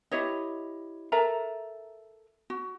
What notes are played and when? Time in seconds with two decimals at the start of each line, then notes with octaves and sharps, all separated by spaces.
0.11 E4 G4 C#5 D#5
1.12 A4 A#4 E5 A#5
2.50 F#4